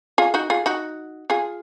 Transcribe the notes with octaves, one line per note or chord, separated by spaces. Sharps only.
F4 G#4
D#4 F#4
F4 G#4
D#4 F#4
F4 G#4